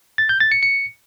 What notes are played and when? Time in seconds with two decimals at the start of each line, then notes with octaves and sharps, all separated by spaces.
0.18 A6
0.29 G6
0.40 A6
0.52 C#7
0.63 C#7